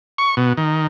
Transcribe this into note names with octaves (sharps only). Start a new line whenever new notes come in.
C#6
B2
D#3